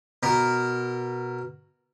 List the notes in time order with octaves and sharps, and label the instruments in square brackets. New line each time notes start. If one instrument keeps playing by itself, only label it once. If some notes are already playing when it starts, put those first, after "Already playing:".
[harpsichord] B2 A#4